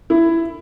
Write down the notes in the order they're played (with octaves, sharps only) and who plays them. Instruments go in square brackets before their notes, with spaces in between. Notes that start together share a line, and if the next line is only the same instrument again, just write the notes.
[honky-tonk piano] E4